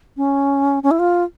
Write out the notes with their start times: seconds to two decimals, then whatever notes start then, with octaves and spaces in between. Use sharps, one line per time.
0.17 C#4
0.83 C#4
0.91 E4
0.99 F4